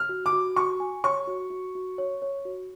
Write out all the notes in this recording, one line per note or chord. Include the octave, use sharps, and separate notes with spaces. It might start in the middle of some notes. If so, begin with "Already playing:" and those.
Already playing: F6
F#4
D6
F#4
F#4 C#6
G#5
C#5 C#6
F#4
F#4
F#4
C#5
C#5
F#4